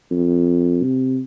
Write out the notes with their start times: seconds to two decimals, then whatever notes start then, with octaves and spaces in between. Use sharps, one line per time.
0.11 F2
0.83 C3